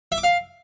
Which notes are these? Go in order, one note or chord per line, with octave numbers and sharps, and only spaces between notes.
E5
D6
F5